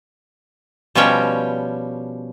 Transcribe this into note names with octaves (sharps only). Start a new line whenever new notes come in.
B2 F3 G3 C#4 C#5 G5